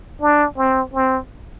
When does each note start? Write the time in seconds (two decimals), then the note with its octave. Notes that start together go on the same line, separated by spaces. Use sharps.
0.22 D4
0.58 C4
0.93 C4